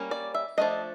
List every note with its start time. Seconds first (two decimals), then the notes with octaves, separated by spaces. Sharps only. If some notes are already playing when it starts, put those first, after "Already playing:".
Already playing: G3 A#3 C#4
0.11 D5
0.34 E5
0.58 F3 A3 D4 D#5